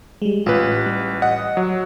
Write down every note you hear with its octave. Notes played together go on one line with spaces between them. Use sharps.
G3 G#3
A1 A2 F4 B4
G3
D#5 F#5
F#3